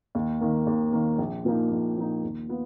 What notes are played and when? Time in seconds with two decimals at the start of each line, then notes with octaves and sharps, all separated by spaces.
0.15 D#2
0.41 D#3 A#3
0.67 D#2
0.92 D#3 A#3
1.18 A#1
1.45 A#2 F3 A#3 D#4
1.71 A#1
1.97 A#2 F3 A#3 D#4
2.23 D#2
2.49 B3 F4